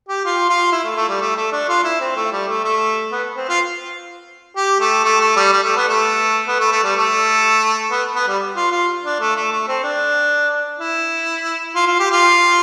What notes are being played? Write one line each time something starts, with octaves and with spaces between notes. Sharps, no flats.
G4
F4
F4
E4
A3
A3
G3
A3
A3
D4
F4
E4
C4
A3
G3
A3
A3
B3
C4
F4
G4
A3
A3
A3
G3
G3
A3
B3
A3
B3
A3
A3
G3
A3
B3
B3
G3
F4
F4
D4
A3
A3
A3
C4
D4
E4
F4
F4
G4
F4